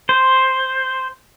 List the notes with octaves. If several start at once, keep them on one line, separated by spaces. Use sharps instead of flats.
C5